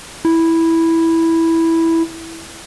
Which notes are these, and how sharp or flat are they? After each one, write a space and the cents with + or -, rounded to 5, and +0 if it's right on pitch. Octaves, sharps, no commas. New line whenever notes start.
E4 -5